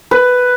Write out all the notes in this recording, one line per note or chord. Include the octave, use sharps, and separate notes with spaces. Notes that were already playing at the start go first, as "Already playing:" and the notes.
B4